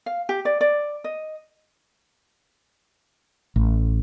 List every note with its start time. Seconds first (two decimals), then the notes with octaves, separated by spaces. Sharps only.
0.06 F5
0.29 G4
0.45 D5
0.61 D5
1.04 D#5
3.56 A1